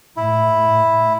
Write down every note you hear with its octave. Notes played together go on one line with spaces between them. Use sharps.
A2 E4